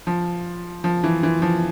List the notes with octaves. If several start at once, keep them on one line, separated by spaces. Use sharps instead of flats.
F3
F3
E3
E3
F3